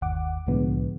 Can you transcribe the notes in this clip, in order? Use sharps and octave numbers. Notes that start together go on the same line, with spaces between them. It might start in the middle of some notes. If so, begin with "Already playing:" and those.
G1 D#2 F#5 D6
C2 A2 D3 F3 G#3 B3